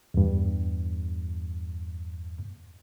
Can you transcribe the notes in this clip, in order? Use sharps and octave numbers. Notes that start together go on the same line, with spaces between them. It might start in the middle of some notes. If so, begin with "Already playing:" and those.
E2 G2